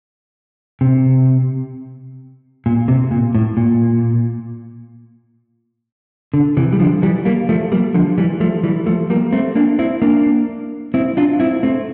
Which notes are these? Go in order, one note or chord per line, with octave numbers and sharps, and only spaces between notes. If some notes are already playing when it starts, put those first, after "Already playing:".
C3
A#2
C3
A#2
A2
A#2
D3
C3 E3
G3
D3 F3
E3 G3
G3 A#3
F3 A3
G3 A#3
D3 F3
E3 G3
F3 A3
E3 G3
F3 A3
G3 A#3
A3 C4
A#3 D4
C4 E4
A#3 D4
C4 E4
D4 F4
C4 E4
A3 C4